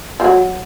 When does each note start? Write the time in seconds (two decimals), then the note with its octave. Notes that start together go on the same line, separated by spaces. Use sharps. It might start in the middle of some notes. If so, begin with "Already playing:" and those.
0.20 F3
0.24 F#3